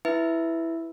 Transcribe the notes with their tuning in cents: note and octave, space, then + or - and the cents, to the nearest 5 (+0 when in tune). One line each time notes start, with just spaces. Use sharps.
E4 +0 B4 +0 E5 +0